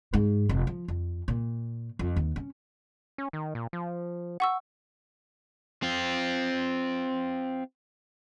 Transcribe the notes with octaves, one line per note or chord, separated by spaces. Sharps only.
G#2
F1
F3
F2
A#2
F2
D#2
C#4
C#4
D#3
A#2
F3
F#5 C#6 E6
C4 F4